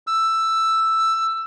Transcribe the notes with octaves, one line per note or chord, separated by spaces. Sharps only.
E6